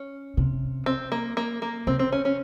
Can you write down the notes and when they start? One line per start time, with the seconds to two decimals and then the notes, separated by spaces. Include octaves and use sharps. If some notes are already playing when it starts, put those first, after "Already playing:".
Already playing: C#4
0.37 C3
0.86 C4
1.12 A#3
1.37 A#3
1.62 A#3
1.87 C3 C4
1.99 C4
2.12 C#4
2.25 C#4